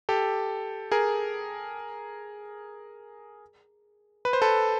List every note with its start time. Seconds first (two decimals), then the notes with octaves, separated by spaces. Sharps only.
0.09 G4 A4
0.92 G#4 A#4
4.25 B4
4.33 C5
4.42 A4 B4